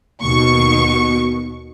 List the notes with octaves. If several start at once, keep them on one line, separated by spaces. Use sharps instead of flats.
D#2 B2 C#6